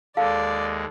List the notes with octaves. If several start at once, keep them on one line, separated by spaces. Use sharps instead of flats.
D#2 G#3 A4 D5 F5